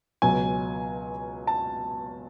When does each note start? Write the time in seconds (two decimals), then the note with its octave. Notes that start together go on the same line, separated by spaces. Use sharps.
0.22 C#2 B2 F#3 G#5
1.47 A5